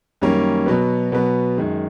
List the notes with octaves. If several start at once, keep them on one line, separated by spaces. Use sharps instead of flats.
F#2 D#3 G3 A#3 C#4
B2 F#3 B3
B2 F#3 B3
F#2 D#3 G#3